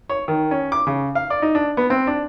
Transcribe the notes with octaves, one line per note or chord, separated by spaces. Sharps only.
C#5
D#3
C#4
D6
C#3
F5
D5
D#4
D4
B3
C4
D4